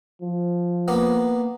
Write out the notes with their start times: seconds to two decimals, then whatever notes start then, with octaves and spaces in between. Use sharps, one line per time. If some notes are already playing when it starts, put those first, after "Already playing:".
0.21 F3
0.88 A#3 B3